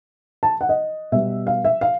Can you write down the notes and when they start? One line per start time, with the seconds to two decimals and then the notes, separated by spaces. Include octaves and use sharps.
0.43 A5
0.61 F#5
0.69 D#5
1.12 B2 G3 B3 E5
1.47 F5
1.65 E5
1.81 F5